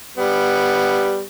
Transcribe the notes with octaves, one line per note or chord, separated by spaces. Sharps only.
G3 B3